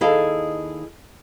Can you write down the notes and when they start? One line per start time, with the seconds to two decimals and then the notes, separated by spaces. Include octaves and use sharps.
0.01 D#2 E4 G#4 A4 D#5 F5